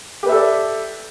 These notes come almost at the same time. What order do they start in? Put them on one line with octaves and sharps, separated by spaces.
G4 B4 E5 A4 D5